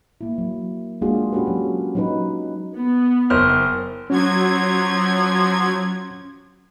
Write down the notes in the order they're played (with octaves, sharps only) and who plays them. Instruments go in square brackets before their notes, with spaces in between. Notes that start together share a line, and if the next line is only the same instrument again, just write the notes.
[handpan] A#3 E4
F#3
G#3 A#3 D4 F4 F#4 G#4
C#4 D4 F#4 G4 A4 B4
F#3 C#4
F#3 C#4 D#4 F#4 B4
[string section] B3
[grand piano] F#1 C5 F6
[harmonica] F3 [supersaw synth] F#3 G#6 [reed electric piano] C#4